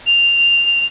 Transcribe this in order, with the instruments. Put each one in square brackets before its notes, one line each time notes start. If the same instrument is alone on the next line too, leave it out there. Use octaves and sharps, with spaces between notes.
[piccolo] F7